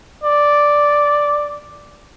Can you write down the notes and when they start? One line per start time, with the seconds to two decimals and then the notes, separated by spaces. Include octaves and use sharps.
0.24 D5